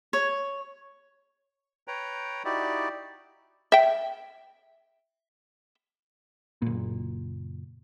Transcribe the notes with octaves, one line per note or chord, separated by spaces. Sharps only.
C#5
B4 C#5 G5 A#5
D#4 E4 F#4 G4 D5
E5 G5
F#1 A#2